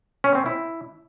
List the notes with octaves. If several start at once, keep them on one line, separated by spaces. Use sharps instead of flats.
C#4
C4
E4